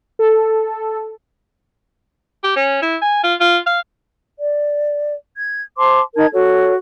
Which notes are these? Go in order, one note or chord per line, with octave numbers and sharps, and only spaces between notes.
A4
G4
C#4
E4
G#5
F4
F4
F5
D5
G#6
C5 A5 C6 D6
D#4 A#4 A5 G#6
F#4 A4 C#5